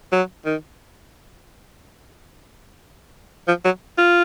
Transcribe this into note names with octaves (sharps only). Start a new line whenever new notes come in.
F#3
D#3
F3
F#3
F4